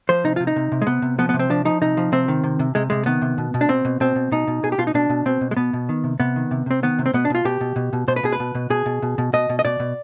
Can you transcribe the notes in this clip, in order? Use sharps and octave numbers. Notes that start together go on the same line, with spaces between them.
F3 C5
C3 D#4
C3 F4
D#4
C3
C3
G#3
C3 B3
C3
F3 B3
B3
C3
C4
F3 D4
F3 D#4
C3 D#4
F3
C3 C4
D#3
C3
C3
C3 G#3
C3 G#3
D#3 B3
C3
B2
B2
D4
B2 C4
B2
B2 C4
B2
B2 D#4
B2
B2 G#4
G4
B2 F4
D#4
B2 D4
B2
B2 C4
B2
G#3
B2 B3
B2
D#3
C3
C3 B3
D#3
C3
C3 C4
D#3 B3
C3
C4
B2 B3
D4
B2 F4
B2 G4
B2
B2
B2
B2 C5
B4
B2 G#4
B4
B2
B2
B2 G#4
B2
B2
B2
B2 D#5
B2
D#5
B2 D5
B2